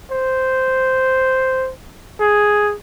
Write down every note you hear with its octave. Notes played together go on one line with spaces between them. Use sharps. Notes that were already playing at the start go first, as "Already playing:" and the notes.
C5
G#4